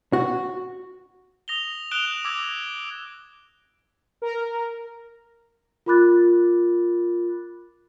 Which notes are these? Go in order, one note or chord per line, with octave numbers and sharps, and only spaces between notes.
F#4
D#6 A#6 F7 G7
D#6 F#6 D7 E7 F7 G7
D6 E6 G#6 A#6
A#4
F4 A#4 B5 D6 F#6 A6